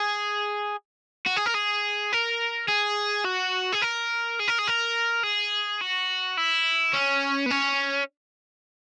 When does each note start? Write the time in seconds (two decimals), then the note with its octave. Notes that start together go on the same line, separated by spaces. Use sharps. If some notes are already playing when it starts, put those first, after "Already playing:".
Already playing: G#4
1.26 F#4
1.37 G#4
1.46 A#4
1.55 G#4
2.13 A#4
2.68 G#4
3.25 F#4
3.72 G#4
3.82 A#4
4.39 G#4
4.48 A#4
4.58 G#4
4.67 A#4
5.23 G#4
5.81 F#4
6.38 E4
6.93 C#4
7.46 B3
7.50 C#4